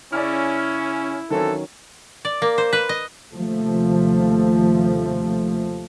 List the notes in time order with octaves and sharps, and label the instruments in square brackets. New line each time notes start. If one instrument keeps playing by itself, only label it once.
[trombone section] C#3 C#4 [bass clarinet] E4 [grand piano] D5 G#5 F6
[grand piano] D#3 F#3 C#4 [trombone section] E3 C4 A4
[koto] D5
A#3
C5
B4
D#5
[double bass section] D#2 C3 F3 A3